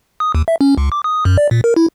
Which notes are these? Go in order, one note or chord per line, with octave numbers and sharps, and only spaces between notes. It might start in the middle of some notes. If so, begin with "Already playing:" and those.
D#6
D#2
E5
C#4
C#2
D6
D#6
F#2
D5
A#2
A#4
E4